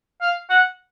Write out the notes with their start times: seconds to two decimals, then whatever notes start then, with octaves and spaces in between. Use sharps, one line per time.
0.21 F5
0.50 F#5